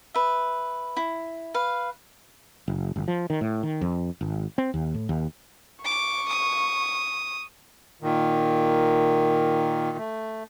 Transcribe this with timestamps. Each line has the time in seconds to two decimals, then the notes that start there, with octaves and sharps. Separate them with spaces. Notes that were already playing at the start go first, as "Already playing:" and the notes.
0.14 B4 E5
0.97 E4
1.54 B4 F5
2.68 F#1
2.96 G1
3.08 F3
3.30 D#3
3.41 A2
3.63 D#3
3.81 F2
4.21 G#1
4.58 C4
4.74 D#2
4.94 A2
5.09 D#2
5.85 C#6 D6
6.28 D#6
8.02 A#2 D#3
9.97 A3